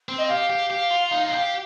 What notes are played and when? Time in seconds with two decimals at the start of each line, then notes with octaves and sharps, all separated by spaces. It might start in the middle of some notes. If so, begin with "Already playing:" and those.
0.09 C4
0.18 D#5
0.29 G4 F5
0.50 G4
0.70 G4
0.91 F4
1.11 D#4
1.23 F4
1.32 G4